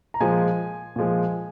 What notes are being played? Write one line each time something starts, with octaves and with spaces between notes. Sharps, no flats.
A#5
A#2 F3 G#3 G#5
A#2 F3 G#3